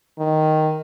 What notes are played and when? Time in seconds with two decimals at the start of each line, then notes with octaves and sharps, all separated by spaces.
0.19 D#3